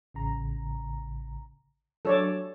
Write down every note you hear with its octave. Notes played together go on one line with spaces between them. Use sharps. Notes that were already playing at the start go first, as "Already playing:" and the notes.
A1 C#3 A#5
F#3 D4 A4 C#5 D5 E6